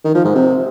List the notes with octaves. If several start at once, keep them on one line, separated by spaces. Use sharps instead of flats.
D#3
F3
G#2
C3